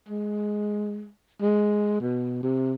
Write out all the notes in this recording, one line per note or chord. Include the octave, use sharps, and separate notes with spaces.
G#3
G#3
B2
C3